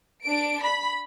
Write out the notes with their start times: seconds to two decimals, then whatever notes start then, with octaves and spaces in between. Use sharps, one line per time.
0.24 D4 D7
0.63 B5